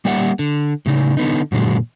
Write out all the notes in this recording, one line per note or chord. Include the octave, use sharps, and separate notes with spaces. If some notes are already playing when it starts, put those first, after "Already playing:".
G3 A#3 G4 D5 E5 F#5
D3
A2 C#3 D#4
D3 B3 D#4
F#2 A#2 D3 F#3 G#3